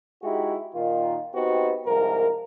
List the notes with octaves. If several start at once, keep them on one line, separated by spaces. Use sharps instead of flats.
G#3 D#4 E4 F#4 G4
A#2 D#3 D#4 F4
B3 C4 D#4 F#4 G4
C2 G#2 F3 A#4